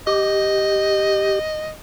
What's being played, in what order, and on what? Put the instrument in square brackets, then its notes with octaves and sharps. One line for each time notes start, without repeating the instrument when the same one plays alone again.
[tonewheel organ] G4 [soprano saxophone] D#5